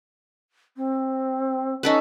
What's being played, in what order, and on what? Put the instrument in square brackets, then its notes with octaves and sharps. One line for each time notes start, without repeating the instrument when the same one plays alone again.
[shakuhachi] C4
[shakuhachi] C#4 [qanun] D#4 A4 B4